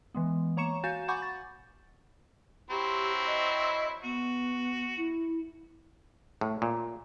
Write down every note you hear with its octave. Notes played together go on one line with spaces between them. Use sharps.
E3 G#3 B3
A#3 C#5 A#5 C#6 C#7 E7
F#4 F5 G#5 G6 A6 E7
F#5 G#5 B5 C#6 D6 G6
A6
F#3 C4 E4 G4
D#5
B3 F#4
E4
A2
A#2